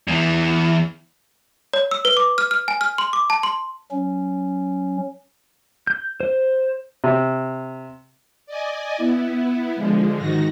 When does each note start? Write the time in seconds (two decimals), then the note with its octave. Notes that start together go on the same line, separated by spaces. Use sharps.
0.08 E2 E3
1.73 C#5
1.91 E6
2.05 B4
2.17 D6
2.38 F6
2.51 F6
2.68 G#5
2.81 F6
2.98 C6
3.13 D6
3.30 A5
3.43 C6
3.91 F#3 C#4
5.87 G6
6.20 C5
7.04 C3
8.46 D5 D#5 G#5
8.97 B3 E4
9.75 D3 F3 G#3
10.18 G#2 D#3 D#4 F#4 A#6